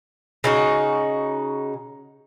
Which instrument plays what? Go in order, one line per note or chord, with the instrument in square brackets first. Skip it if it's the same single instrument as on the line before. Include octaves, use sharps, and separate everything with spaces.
[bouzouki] C#3 D#4 F#4